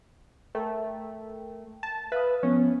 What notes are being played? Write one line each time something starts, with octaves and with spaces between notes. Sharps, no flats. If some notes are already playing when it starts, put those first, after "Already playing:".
A3 A#4 G5
A5
B4 E5 F5 D#6
F3 B3 C#4